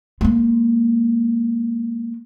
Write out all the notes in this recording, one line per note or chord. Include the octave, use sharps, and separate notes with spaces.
G#3 A#3